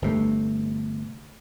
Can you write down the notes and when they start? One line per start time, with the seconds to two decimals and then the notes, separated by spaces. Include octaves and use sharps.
0.02 G1 C3 A3